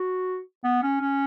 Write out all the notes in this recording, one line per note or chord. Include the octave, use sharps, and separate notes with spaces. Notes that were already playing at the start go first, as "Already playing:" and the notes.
Already playing: F#4
B3
C#4
C#4